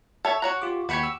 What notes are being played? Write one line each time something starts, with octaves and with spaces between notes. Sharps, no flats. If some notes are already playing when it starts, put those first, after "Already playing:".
A4 C#5 E5
F#4 C#5 A#5 F#6
F4 G4 D6
D#2 F#4 G4 C#5 B5 C#7
E6